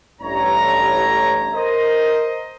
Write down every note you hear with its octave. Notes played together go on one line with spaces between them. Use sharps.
A1 G2 C#5 A#5
A#4 C5 D#5